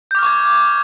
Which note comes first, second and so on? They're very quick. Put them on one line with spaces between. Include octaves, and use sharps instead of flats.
G6 D6 F6 C#6 G#6